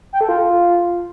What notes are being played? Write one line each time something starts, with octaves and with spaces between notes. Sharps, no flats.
G5
A4
F4